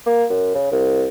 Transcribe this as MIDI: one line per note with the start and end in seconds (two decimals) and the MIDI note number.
0.06 0.24 58
0.30 0.52 42
0.55 0.71 49
0.72 1.07 36